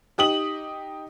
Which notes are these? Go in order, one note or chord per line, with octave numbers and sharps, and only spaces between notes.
D#4 G4 D#6 F#7